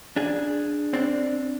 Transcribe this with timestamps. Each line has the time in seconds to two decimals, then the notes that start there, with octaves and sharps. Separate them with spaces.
0.16 D4 G#4
0.94 C4 D4